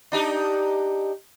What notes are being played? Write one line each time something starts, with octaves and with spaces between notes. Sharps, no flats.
D4 D#4 G4